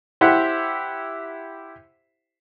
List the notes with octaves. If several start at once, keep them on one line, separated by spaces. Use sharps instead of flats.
E4 G4 C5 E5 F#5